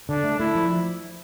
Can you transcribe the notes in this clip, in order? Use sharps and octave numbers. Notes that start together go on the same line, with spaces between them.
D3 D4
A3
A3 E4
F3